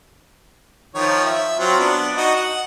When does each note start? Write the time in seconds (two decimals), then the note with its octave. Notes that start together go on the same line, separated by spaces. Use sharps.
0.95 D#3 F3 C#5
1.25 E5
1.59 F#3 C4 F4
1.79 B3 D4
2.17 D#4 F#4 D#5
2.36 F#5